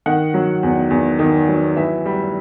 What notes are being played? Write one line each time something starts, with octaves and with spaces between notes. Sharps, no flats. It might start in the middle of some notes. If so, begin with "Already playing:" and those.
D#3 F#5
F#3
E2
E2
D#3
F#3
E3 E5
G3